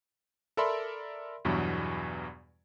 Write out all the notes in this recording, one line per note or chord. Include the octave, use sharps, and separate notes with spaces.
A4 A#4 D5 E5 B5 C6
E2 G2 B2 E3 F#3